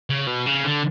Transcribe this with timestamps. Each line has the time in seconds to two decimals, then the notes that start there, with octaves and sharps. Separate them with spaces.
0.10 C#3
0.27 B2
0.46 C#3
0.64 D3